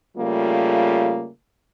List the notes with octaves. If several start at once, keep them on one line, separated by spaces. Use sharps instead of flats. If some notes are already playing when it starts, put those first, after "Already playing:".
C#3 G3 A3 A#3 F4